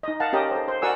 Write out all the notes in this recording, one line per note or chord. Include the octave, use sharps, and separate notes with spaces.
D#4 D#5
A#4 F5 F#5 A5
C#4 G4 A#4 D#5
A4 C5
C5
F#4 A#4 D5 F#5 G#5 E6